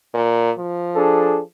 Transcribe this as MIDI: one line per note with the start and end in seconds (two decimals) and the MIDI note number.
0.14 0.51 46
0.58 1.43 53
0.95 1.40 62
0.95 1.40 68
0.95 1.40 69